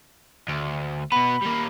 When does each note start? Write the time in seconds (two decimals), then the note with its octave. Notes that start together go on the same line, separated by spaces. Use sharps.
0.49 D2
1.12 B2 B3 B5
1.43 G3 A#3